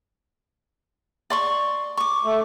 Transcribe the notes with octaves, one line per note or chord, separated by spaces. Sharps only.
D5 C6 C#6
C#6 D6
A3